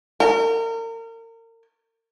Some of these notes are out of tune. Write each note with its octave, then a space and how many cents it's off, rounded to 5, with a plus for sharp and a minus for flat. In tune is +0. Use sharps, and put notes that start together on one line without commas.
A#4 -35